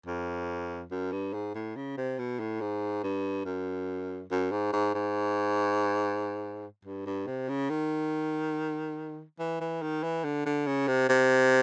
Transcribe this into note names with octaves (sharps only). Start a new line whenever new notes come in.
F2
F#2
G2
G#2
A2
C#3
C3
B2
A2
G#2
G2
F#2
F#2
G#2
G#2
G#2
G2
G2
C3
C#3
D#3
E3
E3
D#3
E3
D3
D3
C#3
C3
C3